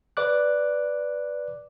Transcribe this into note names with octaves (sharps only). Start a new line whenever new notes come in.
B4 D5 D6 F#6